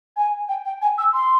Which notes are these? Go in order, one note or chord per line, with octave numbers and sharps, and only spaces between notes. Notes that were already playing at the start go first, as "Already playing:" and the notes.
G#5
G5
G5
G#5
E6
C6